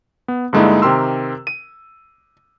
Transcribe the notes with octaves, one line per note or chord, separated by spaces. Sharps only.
B3
G2 D3 G#3 A#3 D#4 E4
C3 D#3 G4 A#4 C6 E6
D#7